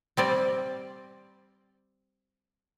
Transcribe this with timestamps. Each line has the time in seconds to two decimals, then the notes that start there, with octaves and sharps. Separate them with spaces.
0.17 G3 C4 D5